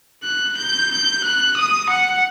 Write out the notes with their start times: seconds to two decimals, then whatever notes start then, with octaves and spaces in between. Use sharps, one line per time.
0.24 F#6
0.57 G6
0.91 G6
1.24 F#6
1.57 D#6
1.90 F#5